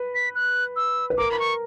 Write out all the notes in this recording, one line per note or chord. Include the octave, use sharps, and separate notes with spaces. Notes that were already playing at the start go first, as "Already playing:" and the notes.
Already playing: B4
B6
F#6
E6
B4
A#4 D6
B5
C#6